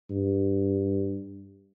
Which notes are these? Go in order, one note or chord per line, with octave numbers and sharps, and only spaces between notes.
G2